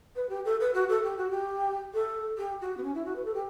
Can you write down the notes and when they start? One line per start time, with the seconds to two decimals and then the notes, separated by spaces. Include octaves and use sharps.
0.15 B4
0.29 G4
0.45 A4
0.60 B4
0.74 F#4
0.89 A4
1.03 G4
1.17 F#4
1.30 G4
1.94 A4
2.37 G4
2.61 F#4
2.77 B3
2.83 C#4
2.94 E4
3.05 F#4
3.15 B4
3.25 A4
3.34 G4